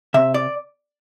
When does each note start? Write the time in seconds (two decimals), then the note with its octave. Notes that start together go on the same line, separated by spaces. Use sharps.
0.14 C3 E5
0.34 D5